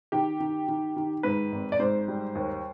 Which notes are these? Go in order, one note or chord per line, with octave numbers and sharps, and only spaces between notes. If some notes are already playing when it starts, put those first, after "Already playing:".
D#3 G4
D#3
D#3
D#3
G#2 B4
G#1
D5
G#2 C5
G3
D#2